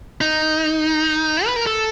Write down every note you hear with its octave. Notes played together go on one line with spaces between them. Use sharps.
D#4
B4
A#4
A4